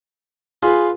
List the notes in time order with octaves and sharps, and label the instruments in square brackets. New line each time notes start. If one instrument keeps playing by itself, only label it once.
[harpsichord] F4 B4 [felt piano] G#4